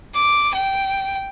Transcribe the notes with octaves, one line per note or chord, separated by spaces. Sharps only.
D6
G5